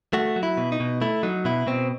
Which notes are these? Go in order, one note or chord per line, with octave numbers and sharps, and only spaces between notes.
A3 F#4
F#3
E4
B2
D#4
B2
A3 E4
F#3 D#4
B2 E4
B2 C4